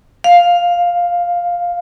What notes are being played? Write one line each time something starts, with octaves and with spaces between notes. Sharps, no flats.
F5